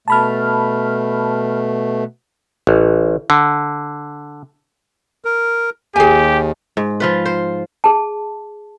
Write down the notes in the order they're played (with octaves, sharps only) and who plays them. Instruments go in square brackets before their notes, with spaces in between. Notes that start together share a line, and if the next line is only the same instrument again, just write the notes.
[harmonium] B2 A3 [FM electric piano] A5 B5 F6
[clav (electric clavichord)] A1
D3
[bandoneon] A#4
[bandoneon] D#2 [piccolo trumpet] G4 [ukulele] G#4 G#5
[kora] G#2
F3 F4 B4
C5
[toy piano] G#4 A5